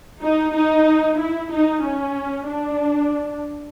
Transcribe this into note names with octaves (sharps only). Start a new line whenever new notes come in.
D#4
D#4
E4
D#4
C#4
D4